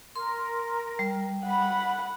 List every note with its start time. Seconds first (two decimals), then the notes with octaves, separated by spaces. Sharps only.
0.16 A#4 C6
0.99 G3
1.46 F#5 B5